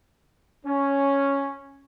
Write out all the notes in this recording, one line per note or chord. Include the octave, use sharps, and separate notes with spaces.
C#4